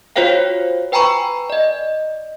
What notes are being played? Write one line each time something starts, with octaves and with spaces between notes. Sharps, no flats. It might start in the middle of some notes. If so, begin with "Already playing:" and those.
F4 F#4 C5 C#5 F5 G5
B4 G5 G#5 A#5 B5 C#6
D5 D#5